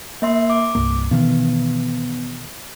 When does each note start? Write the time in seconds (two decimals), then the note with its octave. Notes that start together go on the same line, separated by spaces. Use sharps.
0.22 A#3 E5 C6
0.50 D6
0.75 C2 G2 A#3
1.11 B2 D#3 E3 B3